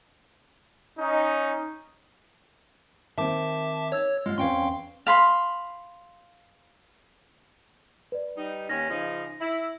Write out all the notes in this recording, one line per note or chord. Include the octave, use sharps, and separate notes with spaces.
C#4 D#4
D#3 C4 E5 A5 D6
C#5 E6 G#6
G#3 F4 F5
E2 C4 C#4 F5 G5 C6
F5 B5 C6
B4 D5
G3 D#4
D#2 C#4 A#6
C#3 F3 D#4
E4